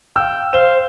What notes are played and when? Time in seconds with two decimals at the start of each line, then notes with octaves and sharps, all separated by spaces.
0.16 F5 G5 E6
0.53 C5 F5 E7 G7